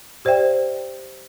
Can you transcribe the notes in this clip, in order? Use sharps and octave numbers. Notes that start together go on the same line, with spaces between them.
G4 C5 D5 E5 G5